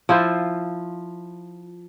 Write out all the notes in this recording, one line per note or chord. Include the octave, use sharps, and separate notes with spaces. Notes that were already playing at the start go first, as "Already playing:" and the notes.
F3 E4 F4 C5